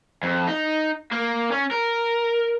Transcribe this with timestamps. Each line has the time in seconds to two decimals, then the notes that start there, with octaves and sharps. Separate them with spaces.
0.23 F2
0.47 D#4
1.12 A#3
1.52 C#4
1.71 A#4